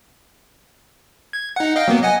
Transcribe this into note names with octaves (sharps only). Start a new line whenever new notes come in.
G#6
D#4 F#5
D#5 F5 G5
F#3 A#3 B3
D#5 F#5 G#5